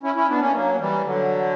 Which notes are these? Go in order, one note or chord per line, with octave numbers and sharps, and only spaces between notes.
C#4 E4
C#4 E4
B3 D4
A#3 C#4
F#3 A#3
A#3
E3 G3
D3 F#3